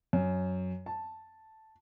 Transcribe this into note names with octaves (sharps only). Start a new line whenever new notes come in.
F#2
A5